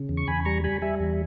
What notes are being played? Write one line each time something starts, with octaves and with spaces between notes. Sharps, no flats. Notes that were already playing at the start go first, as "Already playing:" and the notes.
Already playing: C#3
E2
C#6
E2 G#5 B5
G3 A#5 C#6
G3 G#5 B5
G3 E5 G#5
E2